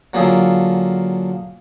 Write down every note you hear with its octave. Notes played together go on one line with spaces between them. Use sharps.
D3 F#3 A#3 F4 G#4 A4